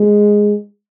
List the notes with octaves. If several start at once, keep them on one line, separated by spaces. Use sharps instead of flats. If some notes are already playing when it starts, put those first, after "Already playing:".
Already playing: G#3